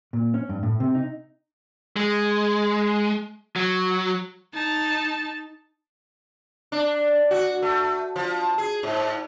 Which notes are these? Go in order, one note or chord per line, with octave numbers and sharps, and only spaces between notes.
A#2
C#4
G2
A2
C3
D#4
G#3
F#3
D#4 A5
D4
F#4
A3
F3
G#4
G#2